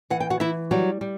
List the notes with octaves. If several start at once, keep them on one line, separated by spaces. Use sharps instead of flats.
E3 F#5
G5
F#4 F#5
E3 E4 E5
F#3 G3 F#4
G3